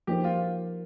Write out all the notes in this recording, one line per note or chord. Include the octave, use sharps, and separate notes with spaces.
F3 A#3 D#4 G4 C5
F4